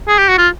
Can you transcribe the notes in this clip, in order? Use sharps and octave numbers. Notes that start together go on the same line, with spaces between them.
G#4
G4
F#4
F4